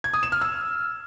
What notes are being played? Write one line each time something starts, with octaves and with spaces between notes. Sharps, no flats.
G#6
D#6
E7
F6
E6